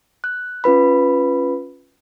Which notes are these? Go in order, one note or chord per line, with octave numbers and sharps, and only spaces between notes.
F#6
C#4 F4 B4 B5